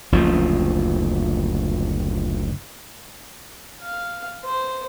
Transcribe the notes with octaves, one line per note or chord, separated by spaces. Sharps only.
F#1 D2 F3
F5
C5